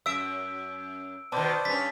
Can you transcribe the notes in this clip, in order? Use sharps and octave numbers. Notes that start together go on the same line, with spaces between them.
F#2 E5 E6 D7
B2 D#3 B4 C5 D5 A5
G2 C#4 A6 B6